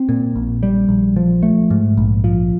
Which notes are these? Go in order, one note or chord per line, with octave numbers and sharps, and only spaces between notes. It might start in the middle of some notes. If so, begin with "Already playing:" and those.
Already playing: C4
A#2
A#1
G3
A#1
F3
A3
G#2
A#1
F3